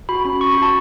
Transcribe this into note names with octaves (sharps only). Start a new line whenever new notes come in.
F#4 B5
C#4 B5
F#4 C#6
B5
F#4 A5